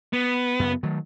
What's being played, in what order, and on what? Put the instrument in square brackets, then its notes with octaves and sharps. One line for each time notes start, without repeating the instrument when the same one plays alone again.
[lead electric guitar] B3
[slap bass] F#2 C#3
D#3 F#3 A3